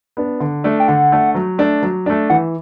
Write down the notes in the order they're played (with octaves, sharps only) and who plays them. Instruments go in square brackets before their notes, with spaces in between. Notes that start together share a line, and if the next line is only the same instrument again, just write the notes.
[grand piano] B3 D4
D3
A3 D4
[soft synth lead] G5
[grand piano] D3 [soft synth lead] F#5
[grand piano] A3 D4
F#3
A3 D4
F#3
A3 D4
[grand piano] E3 [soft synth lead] F#5